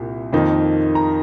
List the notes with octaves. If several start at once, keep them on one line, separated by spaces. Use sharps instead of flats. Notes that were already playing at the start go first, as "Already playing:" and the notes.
Already playing: C2 A#2
F2 D#3 A#3 D#4
A#5